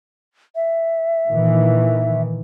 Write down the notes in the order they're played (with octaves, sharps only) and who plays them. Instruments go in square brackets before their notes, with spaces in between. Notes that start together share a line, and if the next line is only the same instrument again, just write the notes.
[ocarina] E5
[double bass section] A#2 D#3 E3